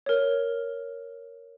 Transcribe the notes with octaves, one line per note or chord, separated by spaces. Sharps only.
A#4 C#5